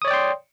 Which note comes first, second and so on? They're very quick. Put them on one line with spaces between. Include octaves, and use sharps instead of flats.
D#6 C#5 D5 G5 C6